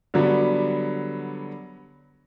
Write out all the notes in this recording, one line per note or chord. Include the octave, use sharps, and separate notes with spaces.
D3 F#3 G3 B3